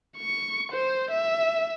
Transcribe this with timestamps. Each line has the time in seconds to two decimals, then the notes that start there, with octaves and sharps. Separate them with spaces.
0.17 C#6
0.72 C5
1.11 E5